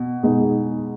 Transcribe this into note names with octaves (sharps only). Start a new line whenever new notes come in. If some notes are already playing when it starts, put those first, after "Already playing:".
Already playing: B2
B2 G#3 D#4